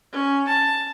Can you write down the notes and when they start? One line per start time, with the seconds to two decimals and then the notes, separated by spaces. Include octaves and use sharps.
0.12 C#4
0.48 A5